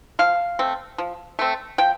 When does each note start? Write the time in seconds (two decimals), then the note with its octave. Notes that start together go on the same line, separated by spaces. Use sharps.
0.19 F3 F5
0.59 A3 C4
0.98 F3
1.39 A3 C4
1.78 F3 G5